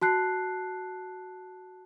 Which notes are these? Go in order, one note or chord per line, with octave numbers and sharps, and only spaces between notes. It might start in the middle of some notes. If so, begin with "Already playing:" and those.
F#4 A5 F#6 C7